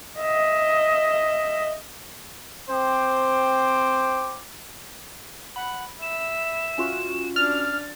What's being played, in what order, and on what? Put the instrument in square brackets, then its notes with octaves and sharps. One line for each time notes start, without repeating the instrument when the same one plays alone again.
[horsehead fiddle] D#5 E5
[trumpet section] C4 C5 G5 D6
[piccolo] F#5 [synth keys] B5
[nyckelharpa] E5 [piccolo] E7
[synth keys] C#4 F4 F#4
[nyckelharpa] D4 [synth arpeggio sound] F6 [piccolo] A6